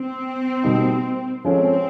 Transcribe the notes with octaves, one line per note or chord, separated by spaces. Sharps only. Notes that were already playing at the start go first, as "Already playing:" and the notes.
Already playing: C4
B2 G3 A#3 D#4
F3 G#3 C4 C#4 F4 A4